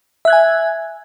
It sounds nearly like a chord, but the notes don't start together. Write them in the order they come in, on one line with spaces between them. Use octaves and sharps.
E5 F#6 G#6 G#5